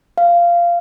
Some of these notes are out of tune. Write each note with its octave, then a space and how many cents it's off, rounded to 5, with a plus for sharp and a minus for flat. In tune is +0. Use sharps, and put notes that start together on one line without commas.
F5 -15